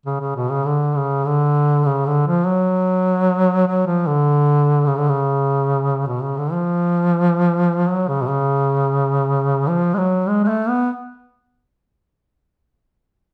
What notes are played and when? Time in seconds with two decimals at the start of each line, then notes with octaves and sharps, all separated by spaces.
0.06 C#3
0.21 C#3
0.36 B2
0.51 C#3
0.66 D3
0.96 C#3
1.26 D3
1.86 C#3
2.06 D3
2.27 F3
2.47 F#3
3.67 F#3
3.87 F3
4.07 D3
4.86 C#3
4.98 D3
5.09 C#3
6.07 B2
6.22 C#3
6.38 D3
6.52 F3
7.88 F#3
8.08 C#3
8.22 B2
8.28 C#3
9.68 F3
9.94 G#3
9.98 F#3
10.28 G#3
10.44 G#3
10.48 A3
10.69 B3